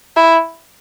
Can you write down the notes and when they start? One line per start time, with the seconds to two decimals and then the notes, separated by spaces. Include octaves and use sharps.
0.16 E4